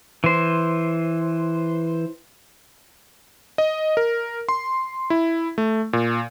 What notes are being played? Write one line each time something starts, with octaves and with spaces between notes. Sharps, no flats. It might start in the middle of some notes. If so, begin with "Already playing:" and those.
E3 C5
D#5
A#4
C6
E4
A3
A#2